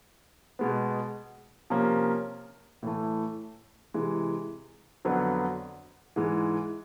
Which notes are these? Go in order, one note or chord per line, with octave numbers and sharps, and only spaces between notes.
B2 G#3 B3
C3 F3 A#3 C#4
A2 E3 A3
C3 E3 G#3
F2 D3 F#3 B3
G#2 E3 G#3